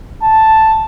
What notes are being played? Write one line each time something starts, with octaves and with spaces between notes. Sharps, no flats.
A5